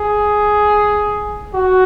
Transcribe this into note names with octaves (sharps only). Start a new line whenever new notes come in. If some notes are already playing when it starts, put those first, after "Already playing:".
Already playing: G#4
F#4